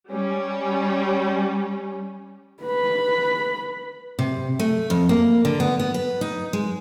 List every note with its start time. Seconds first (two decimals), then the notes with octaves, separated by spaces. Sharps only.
0.11 G3 C#4
2.63 B4 B5
4.19 C3
4.59 A3
4.90 F2
5.09 A#3
5.45 D3
5.60 B3
5.79 B3
5.94 B4
6.21 D#4
6.53 G#3